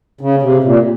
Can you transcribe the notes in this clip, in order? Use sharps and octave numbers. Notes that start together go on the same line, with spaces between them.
C#3
C3
A#2